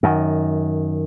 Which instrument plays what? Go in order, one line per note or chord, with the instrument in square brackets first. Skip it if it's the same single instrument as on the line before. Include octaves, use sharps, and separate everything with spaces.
[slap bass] F#2 D#3